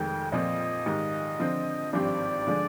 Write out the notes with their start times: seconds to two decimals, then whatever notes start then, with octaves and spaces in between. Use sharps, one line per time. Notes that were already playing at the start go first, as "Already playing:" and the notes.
Already playing: F1 F2 D#3 G#3 G5
0.32 A#2 F3 C4 D#5
0.86 G#2 D#3 G3
1.39 D3 F3 C4
1.93 G#1 G2 F3 C4 G4 D5
2.47 D3 F3 G#3 D4